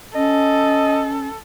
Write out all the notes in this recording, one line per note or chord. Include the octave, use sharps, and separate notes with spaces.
C#4 A4 D#5